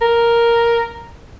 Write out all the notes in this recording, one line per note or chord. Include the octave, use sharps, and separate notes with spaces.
A#4